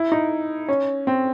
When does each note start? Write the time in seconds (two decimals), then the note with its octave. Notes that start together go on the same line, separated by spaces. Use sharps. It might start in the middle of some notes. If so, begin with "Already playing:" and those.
Already playing: E4
0.12 D#4
0.68 C#4
1.07 C4